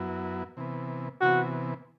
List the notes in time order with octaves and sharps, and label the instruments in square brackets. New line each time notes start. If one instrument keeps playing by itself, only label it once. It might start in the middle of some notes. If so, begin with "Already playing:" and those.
Already playing: [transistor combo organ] F#2 F#3 B3 E4
C3 E3 B3
[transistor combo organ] C3 E3 B3 [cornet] F#4